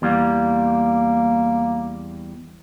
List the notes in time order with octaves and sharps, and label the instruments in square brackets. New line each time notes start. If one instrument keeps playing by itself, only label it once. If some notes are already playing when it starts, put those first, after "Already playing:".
[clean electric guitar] E2 G3 [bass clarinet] A#3